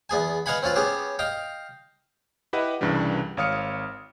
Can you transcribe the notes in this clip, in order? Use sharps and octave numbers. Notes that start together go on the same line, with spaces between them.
E2 B3 G#4 G#5
B4 D#5 F5 F#5 G#5 B5
C4 C#4 F4 B4
B3 C#4 G4 G#4
D#5 F5 G5
E4 G4 B4 D#5 E5 F#5
C2 G2 C#3 E3 G3
G#1 C#5 F5 D#6 F6 C#7